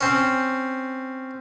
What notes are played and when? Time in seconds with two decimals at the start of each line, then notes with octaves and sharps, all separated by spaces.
0.01 C4 C#4